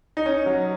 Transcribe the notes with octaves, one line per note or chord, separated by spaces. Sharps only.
D#4
C#4
F#3